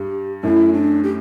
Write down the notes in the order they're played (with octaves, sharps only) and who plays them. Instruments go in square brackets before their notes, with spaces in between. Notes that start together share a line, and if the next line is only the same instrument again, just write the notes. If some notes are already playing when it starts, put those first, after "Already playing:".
Already playing: [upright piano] G2 [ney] G4
[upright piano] F#2 A2 [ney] E4
[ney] D4
G4